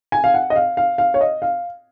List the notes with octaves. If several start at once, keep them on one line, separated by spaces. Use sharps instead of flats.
G#5
F5
F#5
D#5
F5
F5
F5
C#5
D#5
F5